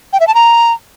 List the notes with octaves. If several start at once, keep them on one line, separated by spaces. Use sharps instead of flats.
G5
E5
A5
A#5